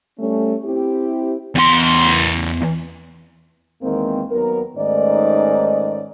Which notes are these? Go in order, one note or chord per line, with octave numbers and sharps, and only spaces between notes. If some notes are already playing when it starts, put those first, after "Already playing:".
G3 A3 C#4
C4 E4 G4
E2 C6
E2 D#3 G#3 A#3 C4
D#2 F#3 B3 A#4
G#2 D#3 A3 C#4 D5 D#5